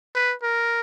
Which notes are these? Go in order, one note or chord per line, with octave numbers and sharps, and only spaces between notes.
B4
A#4